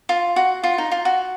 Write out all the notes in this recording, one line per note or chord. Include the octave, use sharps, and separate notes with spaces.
F4
F#4
F4
D#4
F4
F#4